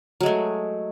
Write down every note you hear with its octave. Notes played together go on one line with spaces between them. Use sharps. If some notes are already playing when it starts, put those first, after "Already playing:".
F#3 G#3 A3